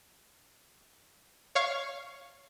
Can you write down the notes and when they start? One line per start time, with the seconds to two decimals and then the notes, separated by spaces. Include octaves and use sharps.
1.55 C#5 F5 C#6